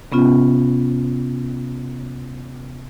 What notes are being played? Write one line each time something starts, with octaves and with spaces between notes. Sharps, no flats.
C3 B3 C#4 F4